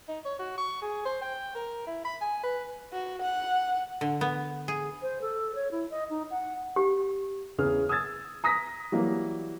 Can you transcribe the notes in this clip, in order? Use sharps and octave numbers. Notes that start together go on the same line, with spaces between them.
D#4
C#5
F#4
C#6
G#4
C5
G5
A#4
E4
B5
G#5
B4
F#4
F#5
D3
B3
G#4
C5
A4
C#5
E4
D#5
D#4
F#5
G4
E2 C#3 G#4 F6
D#6 E6 G#6 A6
A#5 D#6 A#6 B6
E3 F#3 G3 A#3